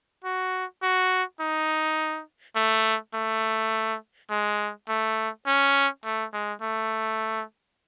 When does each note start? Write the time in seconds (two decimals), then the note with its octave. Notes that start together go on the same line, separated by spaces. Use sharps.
0.24 F#4
0.83 F#4
1.41 D#4
2.56 A3
3.15 A3
4.30 G#3
4.89 A3
5.47 C#4
6.05 A3
6.33 G#3
6.62 A3